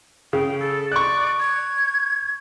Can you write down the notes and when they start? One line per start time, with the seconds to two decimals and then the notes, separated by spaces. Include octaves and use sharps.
0.33 C#3 G5
0.60 A4
0.92 D5 C#6 F#6
1.39 G#6